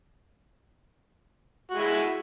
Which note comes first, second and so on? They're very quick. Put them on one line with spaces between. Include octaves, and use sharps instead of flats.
F#4 G#3 E4